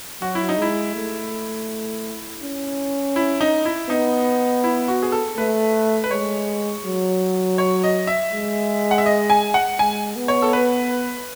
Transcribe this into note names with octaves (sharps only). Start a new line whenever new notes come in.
F#3 F#4
E4
D#4
G#3 E4
A3
C#4
E4
D#4
E4
B3 D#4
E4
F#4
G#4
A4
A3 B4
B4
G#3 C#5
F#3
C#5
D#5
E5
G#3
F#5
E5
D#5
G#5
F#5
G#3 G#5
B3
C#5
A4
B4